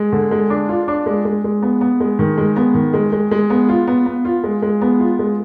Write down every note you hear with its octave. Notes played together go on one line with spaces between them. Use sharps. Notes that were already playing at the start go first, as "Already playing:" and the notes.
Already playing: G#3
D3
G#3
D4
F4
D4
G#3
G#3
G#3
B3
B3
G#3
D#3
G#3
B3
D#3
G#3
G#3
G#3
B3
F4
B3
B3
F4
G#3
G#3
B3
F4
G#3